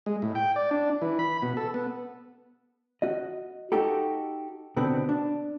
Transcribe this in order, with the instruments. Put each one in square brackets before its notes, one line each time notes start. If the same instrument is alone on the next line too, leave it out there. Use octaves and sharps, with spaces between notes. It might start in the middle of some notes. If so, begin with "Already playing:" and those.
[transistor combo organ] G#3
A2
G5
D5
D4
E3
B5
B2
A4
B3
[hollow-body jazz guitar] F#4 D#5
D#4 F#4 G4 A4
B2 D3 B3 C4
D4